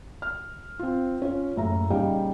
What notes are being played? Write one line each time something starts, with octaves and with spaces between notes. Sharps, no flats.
F6
C4 F4
C#4 F4 C#5
F#1 A2 E5 A#5
A#2 C#3 G3 D#4 F5 G5